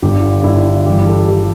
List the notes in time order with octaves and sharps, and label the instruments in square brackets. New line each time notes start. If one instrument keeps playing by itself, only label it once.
[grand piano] G1 G2 D3 G4
G1 G2 D3 E4
G1 G2 E3 G3 G4
A4
E3 G3 G4